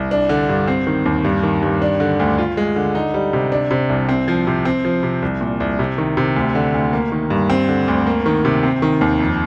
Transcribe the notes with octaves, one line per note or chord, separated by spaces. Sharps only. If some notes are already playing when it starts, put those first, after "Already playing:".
Already playing: C2
D4
D3
G2
C4
D#3
D#2
G2
D#3
G2
D4
D3
D2
F4
G#3
D3
D#4
G3
C3
D4
C3
C2
C4
F3
C3
C4
F3
C3
C2
A#2
C2
C3
D#3
C3
D2
D3
D2
A#3
D#3
G2
C4
D3
D2
A#3
D#3
C3
C4
D#3
D#2
F2